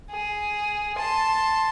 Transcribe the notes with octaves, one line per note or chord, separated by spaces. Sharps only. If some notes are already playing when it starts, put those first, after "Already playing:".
G#4
A5 C6